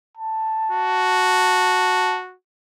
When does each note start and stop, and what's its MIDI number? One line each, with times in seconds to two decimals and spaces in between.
0.17 2.18 81
0.72 2.35 66